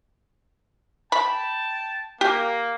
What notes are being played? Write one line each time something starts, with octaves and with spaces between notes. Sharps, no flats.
G5 A5 B5
A#3 G4